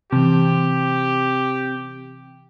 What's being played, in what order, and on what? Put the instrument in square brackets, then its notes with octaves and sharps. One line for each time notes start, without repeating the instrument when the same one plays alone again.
[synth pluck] C3 E3 [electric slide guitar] C4 A5 [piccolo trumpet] G4